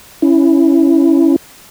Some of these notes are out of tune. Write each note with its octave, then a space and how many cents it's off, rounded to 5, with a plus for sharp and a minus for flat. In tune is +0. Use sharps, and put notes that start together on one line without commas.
C#4 +0 E4 +5